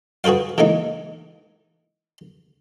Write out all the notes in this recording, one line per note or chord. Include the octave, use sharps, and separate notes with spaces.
F#4 G#4 B4 C5 F5
E3 G#3 A#3 D#4